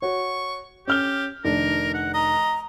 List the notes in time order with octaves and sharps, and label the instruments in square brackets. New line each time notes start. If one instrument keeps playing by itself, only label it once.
[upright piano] F#4 C#5 [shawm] C#6
[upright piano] C#4 F6 G7 [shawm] G4
[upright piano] F1 D#3 D4 [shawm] A#4
[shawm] F#5
[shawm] D#5 [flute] A#5